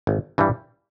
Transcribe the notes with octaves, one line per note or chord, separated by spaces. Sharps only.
G#1
G2 E3 G3